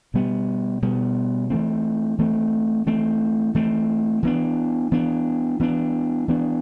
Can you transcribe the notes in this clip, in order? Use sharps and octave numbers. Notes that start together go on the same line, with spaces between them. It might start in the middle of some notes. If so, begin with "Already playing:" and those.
B2 G3 B3
B2 G3 B3
E3 A3 C4
E3 A3 C4
E3 A3 C4
E3 A3 C4
E3 B3 D4
E3 B3 D4
E3 B3 D4
E3 B3 D4